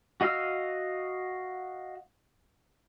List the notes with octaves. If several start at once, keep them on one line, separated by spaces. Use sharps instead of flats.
F#4 D#5 F5 E6 F6